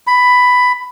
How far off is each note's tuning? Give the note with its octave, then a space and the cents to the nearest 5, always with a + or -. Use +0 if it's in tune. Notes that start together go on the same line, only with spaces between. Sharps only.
B5 +10